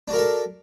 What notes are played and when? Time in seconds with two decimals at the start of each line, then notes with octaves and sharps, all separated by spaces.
0.08 D4
0.10 F#4
0.13 A#4
0.16 E5
0.18 A4